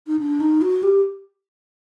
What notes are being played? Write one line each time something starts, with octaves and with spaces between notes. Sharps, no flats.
D#4
D4
D#4
F#4
G4